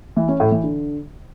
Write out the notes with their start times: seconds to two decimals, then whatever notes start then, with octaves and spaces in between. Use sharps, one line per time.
0.16 E3
0.28 C#4
0.40 A2
0.52 E3
0.63 D3